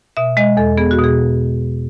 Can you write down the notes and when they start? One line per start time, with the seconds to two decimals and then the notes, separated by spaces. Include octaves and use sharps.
0.17 B2 E5
0.37 G#3 D#5
0.57 E2 A4
0.77 B3 G#4
0.91 F#4
0.98 B2
1.04 G#4